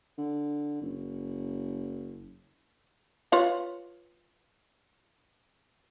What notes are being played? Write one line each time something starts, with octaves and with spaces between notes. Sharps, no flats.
D3
F#1
F4 B4 C#5